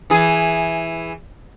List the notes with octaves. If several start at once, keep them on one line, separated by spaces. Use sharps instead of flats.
E3 G#4